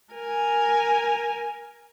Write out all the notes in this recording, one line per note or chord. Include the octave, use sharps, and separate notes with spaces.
A#4 G#5